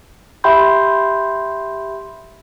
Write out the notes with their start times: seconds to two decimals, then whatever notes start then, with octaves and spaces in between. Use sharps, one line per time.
0.44 G4 E5 G5 B5 C6 G6